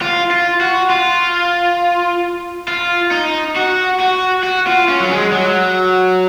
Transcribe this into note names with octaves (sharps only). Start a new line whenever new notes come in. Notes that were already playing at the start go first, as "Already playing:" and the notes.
F4
F4
F#4
F4
F4
D#4
F#4
F#4
F#4
F4
C#4
F#3
G#3
F#3